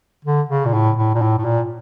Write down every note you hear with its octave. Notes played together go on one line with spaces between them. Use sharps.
D3
C#3
A#2
A2
A2
A#2
A2
A2
A#2